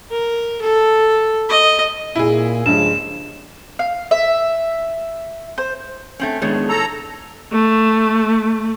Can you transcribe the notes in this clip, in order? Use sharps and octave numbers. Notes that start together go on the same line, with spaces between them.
A#4
A4
D#5
A#2 E4 G#4
G2 C#3 F3 G#3 E7
F5
E5
C5
A3 C4 C#4
A2 D#3 G#3 B3 D4 C#5
A4 A#5
A3